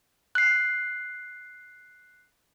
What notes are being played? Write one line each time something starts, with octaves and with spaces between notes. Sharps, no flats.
F#6 C7